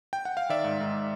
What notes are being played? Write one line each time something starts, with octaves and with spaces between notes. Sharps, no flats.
G5
F#5
F5
D#3 D5 E5
G#2
G#2